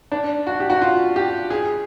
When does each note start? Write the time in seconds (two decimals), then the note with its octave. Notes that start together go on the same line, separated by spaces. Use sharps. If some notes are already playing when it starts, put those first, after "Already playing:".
0.12 D4
0.47 F#4
0.60 G4
0.70 F#4
0.82 F4
1.16 G4
1.50 G#4